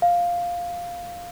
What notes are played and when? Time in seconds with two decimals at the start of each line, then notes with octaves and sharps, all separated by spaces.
0.02 F5